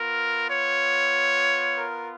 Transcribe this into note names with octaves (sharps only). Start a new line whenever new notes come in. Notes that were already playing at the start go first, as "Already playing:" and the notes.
Already playing: B3 F4 A#4
C#5
A#4